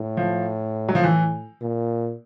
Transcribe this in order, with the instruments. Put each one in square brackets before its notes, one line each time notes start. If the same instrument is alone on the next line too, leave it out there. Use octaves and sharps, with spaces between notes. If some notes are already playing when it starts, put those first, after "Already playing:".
Already playing: [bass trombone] A2
[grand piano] F3
F#3
F3
E3
[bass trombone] A#2